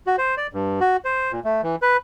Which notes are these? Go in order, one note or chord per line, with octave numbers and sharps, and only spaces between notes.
F#4
C5
D5
G2
F#4
C5
A#2
A3
E3
B4